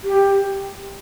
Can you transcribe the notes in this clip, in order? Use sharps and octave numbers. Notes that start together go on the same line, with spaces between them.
G4